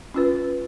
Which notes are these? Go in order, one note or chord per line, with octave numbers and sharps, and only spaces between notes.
C#4 F4 B4